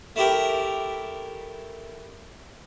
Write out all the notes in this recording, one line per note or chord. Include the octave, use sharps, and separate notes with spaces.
A3 E4 G4 A#4